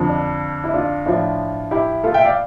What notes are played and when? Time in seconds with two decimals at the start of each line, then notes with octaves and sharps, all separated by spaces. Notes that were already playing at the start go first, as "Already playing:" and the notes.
Already playing: F2 D3 F3
0.09 D4
0.64 E4
0.74 D4 F4
1.06 A2 F3 D4 F4
1.71 E4 G4
2.04 F4 A4
2.14 E5 G5
2.25 D5 F5